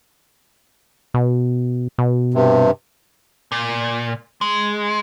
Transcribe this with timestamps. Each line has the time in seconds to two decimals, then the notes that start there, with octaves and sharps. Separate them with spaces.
1.14 B2
1.98 B2
2.34 G2 C3
3.52 A#2
4.41 G#3